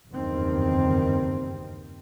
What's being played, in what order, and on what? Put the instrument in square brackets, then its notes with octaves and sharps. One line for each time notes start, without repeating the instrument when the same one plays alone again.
[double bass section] F#1 E2 G2 D#3 C4